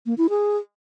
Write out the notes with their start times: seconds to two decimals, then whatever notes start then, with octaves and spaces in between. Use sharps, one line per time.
0.06 A#3
0.18 E4
0.30 G#4